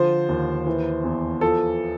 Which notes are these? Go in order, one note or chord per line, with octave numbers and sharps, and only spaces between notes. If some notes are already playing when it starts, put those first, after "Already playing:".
Already playing: D3 F3 C5
D#2
E3
E2
F3 A4